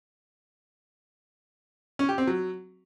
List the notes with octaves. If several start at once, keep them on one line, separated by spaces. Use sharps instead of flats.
C#4
G4
C4
F#3